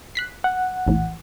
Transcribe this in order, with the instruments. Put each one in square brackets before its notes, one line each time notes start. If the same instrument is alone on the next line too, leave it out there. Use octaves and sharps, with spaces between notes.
[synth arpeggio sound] F#6 B6 C7
[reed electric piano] F#5
[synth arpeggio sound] A#1 E2 A2